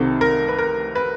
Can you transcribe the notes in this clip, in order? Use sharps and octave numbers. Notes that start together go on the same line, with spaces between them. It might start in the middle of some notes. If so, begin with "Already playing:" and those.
Already playing: C2 C3 D#3 A4
A#4
B4
A#4
B4